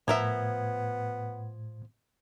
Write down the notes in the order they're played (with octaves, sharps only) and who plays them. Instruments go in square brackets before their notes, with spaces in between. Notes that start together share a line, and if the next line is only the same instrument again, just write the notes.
[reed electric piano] A2 G#6 [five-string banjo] F3 A#4 E5 [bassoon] B3